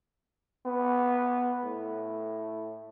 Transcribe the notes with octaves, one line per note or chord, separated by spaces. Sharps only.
B3
A2